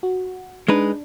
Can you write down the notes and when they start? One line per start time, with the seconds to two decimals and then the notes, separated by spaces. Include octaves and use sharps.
0.03 F#4
0.68 G#3 D4 D#4 B4